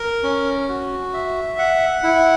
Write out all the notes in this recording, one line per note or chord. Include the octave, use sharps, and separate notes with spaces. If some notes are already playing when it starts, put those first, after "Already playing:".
Already playing: A#4
C#4
F#4
E5
F#5
E4